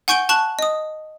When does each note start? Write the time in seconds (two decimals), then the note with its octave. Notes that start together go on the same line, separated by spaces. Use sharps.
0.08 F#5 G#5 C#6 G6 D7 G7
0.29 A5 C#6 F#6 F#7
0.59 D#5 D#6